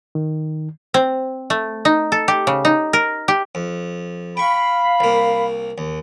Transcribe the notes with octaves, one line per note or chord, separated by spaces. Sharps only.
D#3
C4
A3
D#4
A4
G4
C#3
D#4
A#4
G4
F2
F5 G5 B5 C#6
C2 A#3
D#2